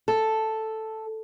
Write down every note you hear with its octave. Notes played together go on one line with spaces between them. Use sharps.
A4